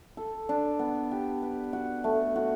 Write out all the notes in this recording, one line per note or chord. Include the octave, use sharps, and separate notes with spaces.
A4
D4
B3
G4
B4
F#4
A3
F#4